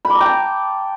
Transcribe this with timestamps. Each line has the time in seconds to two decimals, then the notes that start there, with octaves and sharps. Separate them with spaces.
0.05 B5
0.10 D6
0.15 A#5
0.21 G5
0.26 A5